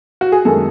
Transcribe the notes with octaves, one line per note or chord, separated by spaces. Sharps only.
F#4
G#4
F#2 D#3 G#3 A4